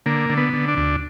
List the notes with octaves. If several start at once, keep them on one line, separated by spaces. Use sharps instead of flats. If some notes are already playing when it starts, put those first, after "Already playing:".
D3 A#3
D3
B3
D3
D4
D2